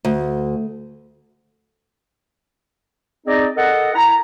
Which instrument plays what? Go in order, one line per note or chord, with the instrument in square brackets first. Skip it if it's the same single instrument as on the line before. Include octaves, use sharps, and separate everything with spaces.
[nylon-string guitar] D2
[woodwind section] C4 D#4 G#4 D5 D#5
A4 A#4 D#5 F#5
E4 A#5